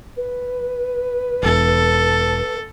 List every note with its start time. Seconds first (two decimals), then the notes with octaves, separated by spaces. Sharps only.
0.17 B4
1.43 E1 E2 E3 A4